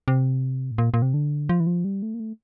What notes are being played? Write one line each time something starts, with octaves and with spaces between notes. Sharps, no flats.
C3
A2
A#2
A#2
C3
D3
F3
E3
F3
G3
A3
A#3
A3